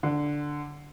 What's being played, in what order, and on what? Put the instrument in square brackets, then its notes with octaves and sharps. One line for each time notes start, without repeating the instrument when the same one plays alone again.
[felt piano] D3